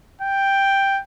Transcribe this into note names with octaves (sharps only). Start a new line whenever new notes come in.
G5